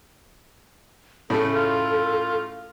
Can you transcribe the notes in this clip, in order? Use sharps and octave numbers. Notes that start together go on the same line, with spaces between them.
A2 C#3 A3 A4
F4